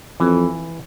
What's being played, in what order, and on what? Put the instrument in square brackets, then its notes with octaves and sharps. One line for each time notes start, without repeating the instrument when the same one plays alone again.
[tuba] F2 [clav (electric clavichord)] E3